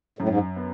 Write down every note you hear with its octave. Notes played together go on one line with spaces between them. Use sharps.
F#2 A2
G#2
B3